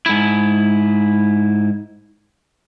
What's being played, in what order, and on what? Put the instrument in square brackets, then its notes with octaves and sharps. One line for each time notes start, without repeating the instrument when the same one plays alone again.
[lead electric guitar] G#2 E4